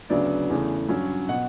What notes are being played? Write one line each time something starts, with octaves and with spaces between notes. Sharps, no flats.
D2 C#3 F#3 B3 D4 D5
E2 C#3 E3 A3
G2 F#3 C#4
B2 F#5